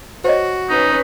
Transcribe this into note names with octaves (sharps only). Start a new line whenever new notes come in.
F#4 C5 C#5 D#5
C#4 D#4 B4